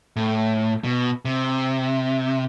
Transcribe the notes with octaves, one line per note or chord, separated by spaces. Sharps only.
A2
B2
C3